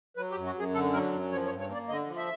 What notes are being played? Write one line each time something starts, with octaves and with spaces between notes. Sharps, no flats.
F#3 B4
G4
F#2
F#4
F#2 G#4
D3 A4
F#3 A#4
F#2
F3 C#5
C#5
G2
C#5
A#3 D5
D3 D#5
F3
E5